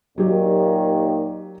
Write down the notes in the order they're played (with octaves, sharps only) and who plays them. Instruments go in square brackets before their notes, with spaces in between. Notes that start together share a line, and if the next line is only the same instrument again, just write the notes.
[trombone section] D#2 A#2 D#3 [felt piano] F#3 G4